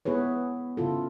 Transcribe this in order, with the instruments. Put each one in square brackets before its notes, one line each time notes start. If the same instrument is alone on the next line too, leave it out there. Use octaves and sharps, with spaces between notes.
[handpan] B3 E4 G#4 B4 C#5
C#3 E4 F4 A4